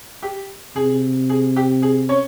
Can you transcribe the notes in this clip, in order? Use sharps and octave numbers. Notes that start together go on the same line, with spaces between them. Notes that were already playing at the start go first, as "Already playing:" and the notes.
G4
C3 G#4
G#4
G4
G#4
C#4 C#5